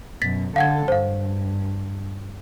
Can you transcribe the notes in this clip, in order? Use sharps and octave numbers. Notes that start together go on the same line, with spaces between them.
F#2 B2 A6 B6
D3 A4 F5 F#5 G#6
G2 C5 F5